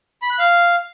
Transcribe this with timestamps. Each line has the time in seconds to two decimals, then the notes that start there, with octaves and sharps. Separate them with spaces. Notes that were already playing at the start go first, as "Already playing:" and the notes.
0.22 B5
0.30 F#6
0.39 F5